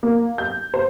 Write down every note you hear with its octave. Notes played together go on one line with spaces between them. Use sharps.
A#3
G6
C5